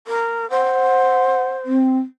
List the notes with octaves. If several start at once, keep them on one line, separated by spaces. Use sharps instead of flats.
A#4
C5 F#5
C4